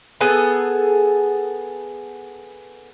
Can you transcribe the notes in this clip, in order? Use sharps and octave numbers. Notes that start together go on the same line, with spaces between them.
B3 G#4 A4